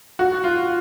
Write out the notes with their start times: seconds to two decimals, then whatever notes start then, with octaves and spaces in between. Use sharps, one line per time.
0.19 F#4
0.44 F4